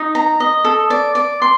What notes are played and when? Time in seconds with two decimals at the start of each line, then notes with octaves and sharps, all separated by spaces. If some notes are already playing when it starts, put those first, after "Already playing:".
Already playing: D#4
0.15 A#5
0.40 D#5
0.65 A4
0.90 D5
1.15 D5
1.42 C6